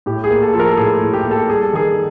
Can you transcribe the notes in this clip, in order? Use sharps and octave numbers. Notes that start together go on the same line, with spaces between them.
A2 G4
G#4
A#3
A4
F3 A4
A#4
A4
A2 G#4
G#4
A2
G4
A#3
A4
G3 G#4
A4
D#3 G#4